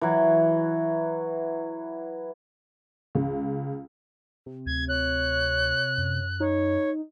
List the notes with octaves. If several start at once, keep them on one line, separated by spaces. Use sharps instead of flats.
E3 F#3
C#2
C3
D2 G#6
C#5 F#6
F#2
D#4 C#5